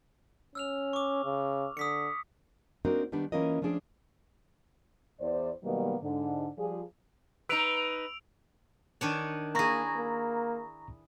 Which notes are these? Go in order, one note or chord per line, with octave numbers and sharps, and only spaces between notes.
C#4 E6 F6 F7
C#6 D6
C#3
D3 D#6 B6 C#7
A#3 C4 D4 D#4 F#4 A#4
D#3 G3 B3 D4
E3 A#3 C#4 F4 A#4 D#5
F3 A3 C#4 D4 G#4 D5
E2 C5 D5
B2 D#3 F#3 G3 A#3 B3
G#2 D3
F3 G3 F4 G#4
D#4 B4 E6 D7 F7
D#3 D4 C#5
A#3 E4 G#4 A#5 C#6 A#6
A#3